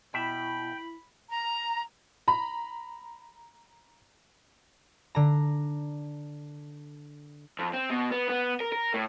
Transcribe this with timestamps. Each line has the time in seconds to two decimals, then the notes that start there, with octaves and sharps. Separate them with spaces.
0.14 B2 E4 E5 G5 B5
1.30 A#5
2.28 A#5 B5
5.15 D3 A#5
7.59 F2
7.73 C4
7.90 B2
8.11 B3
8.29 B3
8.61 A#4
8.72 A#4
8.94 A2